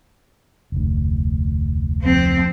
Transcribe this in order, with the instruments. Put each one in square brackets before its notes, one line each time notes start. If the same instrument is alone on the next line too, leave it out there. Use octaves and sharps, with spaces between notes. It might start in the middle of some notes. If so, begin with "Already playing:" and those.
[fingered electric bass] F1 D2
[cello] F3 C4